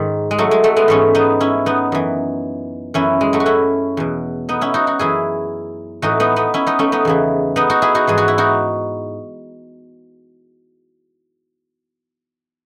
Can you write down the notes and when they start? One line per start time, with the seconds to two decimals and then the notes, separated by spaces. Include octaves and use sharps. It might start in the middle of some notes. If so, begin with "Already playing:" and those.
Already playing: G#2 D#3
0.31 G#3
0.38 F#3 A3
0.51 G#3
0.64 F#3 A3
0.76 G#3 B3
0.88 G#2 E3 A3 C#4
1.15 B3 D#4
1.40 C#4 E4
1.66 B3 D#4
1.92 F#2 E3
2.94 F#2 E3 C#4 E4
3.21 G#3
3.33 F#3 A3
3.40 F#4
3.46 C#4 E4
3.97 E2 B2
4.49 B3 D#4
4.61 C#4 E4
4.74 D#4 F#4
4.87 D#4 F#4
4.99 F#2 E3 E4 G#4
6.02 A2 E3 D#4 F#4
6.20 B3 D#4
6.36 B3 D#4
6.54 C#4 E4
6.67 B3 D#4
6.79 A3 C#4
6.92 B3 D#4
7.05 E2 C#3 E3
7.56 B3 D#4
7.70 D#4 F#4
7.82 E4 G#4
7.95 D#4 F#4
8.07 G#2 E3 G#4
8.18 F#4
8.28 E4
8.38 D#4 F#4